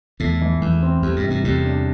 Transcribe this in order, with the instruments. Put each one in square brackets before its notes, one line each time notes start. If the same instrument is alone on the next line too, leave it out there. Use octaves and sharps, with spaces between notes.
[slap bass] E2 A2 [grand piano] A3
[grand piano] E3
[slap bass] E2 [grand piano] E3
[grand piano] C4
[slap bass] E2 [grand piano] G3
[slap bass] G2
[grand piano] C3
[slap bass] G2
[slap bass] E2 A2 [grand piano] C3
[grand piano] D4